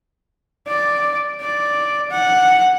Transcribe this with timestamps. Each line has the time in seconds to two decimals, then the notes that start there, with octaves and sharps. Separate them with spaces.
0.68 D5
1.42 D5
2.11 F#5